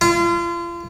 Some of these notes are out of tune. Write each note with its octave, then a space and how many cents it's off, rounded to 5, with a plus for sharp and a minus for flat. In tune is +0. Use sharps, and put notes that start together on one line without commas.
F4 -35